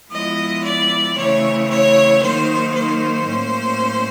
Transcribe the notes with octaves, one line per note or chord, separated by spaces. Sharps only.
F3 G#3 B3 E4 D#5
D5
C#3 E3 A3 C4 C#5
C#5
D#3 F#3 A#3 D#4 C5
C5
A2 F#3 A#3 C#4